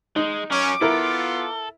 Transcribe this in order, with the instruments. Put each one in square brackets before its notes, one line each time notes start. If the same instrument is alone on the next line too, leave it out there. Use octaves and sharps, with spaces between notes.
[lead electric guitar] G#3 [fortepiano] D#4
[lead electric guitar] F#3 A#4 [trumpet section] C#4 [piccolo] D6
[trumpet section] B3 F4 [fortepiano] E4 A#4 [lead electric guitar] A4